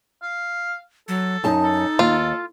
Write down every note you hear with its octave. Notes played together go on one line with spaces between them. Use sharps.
F5
F#3 A4
F#2 D#4 A5
A4
D#2 F4